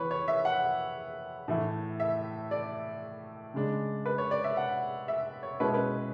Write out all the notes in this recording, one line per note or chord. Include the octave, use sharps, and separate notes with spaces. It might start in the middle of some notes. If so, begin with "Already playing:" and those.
Already playing: E3 B3 B4 C#5
C#5
E5
F#5
A2 E3 A3 E4
E5
D5
C#3 G#3 D4
B4
C#5
D5
E5
F#5
E5
C#5
B2 G#3 C#4 E4 B4
C#5
B4